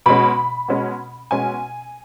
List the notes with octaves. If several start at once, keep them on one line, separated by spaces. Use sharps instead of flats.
B2 G#3 C#4 B5
B2 G#3 C#4
B2 G#3 C#4 G#5